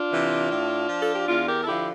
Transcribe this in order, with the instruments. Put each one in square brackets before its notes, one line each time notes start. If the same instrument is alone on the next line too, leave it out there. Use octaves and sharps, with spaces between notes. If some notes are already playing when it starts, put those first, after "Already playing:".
Already playing: [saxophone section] D4 F4
C3 E3
A2
F3
A4
G4
E2 D4 F4
G4 A#4
A4
D3 F3 E4 G4